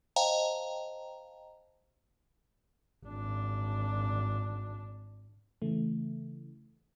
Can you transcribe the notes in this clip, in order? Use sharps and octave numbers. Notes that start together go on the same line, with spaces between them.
C5 D#5 F5 G5 A5 A#5
G#1 D4
C#3 E3 A3